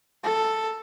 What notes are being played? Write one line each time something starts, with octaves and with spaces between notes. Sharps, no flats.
A4